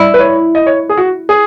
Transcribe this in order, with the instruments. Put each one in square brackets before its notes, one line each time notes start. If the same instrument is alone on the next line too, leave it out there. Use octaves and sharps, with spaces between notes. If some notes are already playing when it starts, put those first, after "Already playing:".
Already playing: [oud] E4
[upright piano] B4
C#5
D#5
C#5
G#4
F#4
G#4